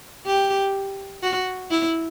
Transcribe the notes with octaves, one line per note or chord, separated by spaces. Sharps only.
G4
F#4
E4